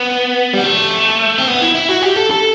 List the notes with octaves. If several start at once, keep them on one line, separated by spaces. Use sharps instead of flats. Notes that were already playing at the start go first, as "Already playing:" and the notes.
Already playing: B3
G3
A3
C4
B3
E4
E4
F#4
G4
A4
A4